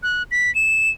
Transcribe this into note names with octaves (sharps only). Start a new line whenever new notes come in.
F#6
B6
E7